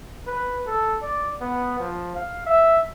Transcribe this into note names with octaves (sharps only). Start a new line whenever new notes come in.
B4
A4
D5
B3
F3
F5
E5